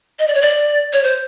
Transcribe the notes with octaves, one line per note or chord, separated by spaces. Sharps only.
D#5
D5
C#5
D5
C#5
C5